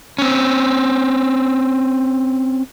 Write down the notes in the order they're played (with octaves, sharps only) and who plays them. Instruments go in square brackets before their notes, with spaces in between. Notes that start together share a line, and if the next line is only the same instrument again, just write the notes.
[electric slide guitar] C4 C#4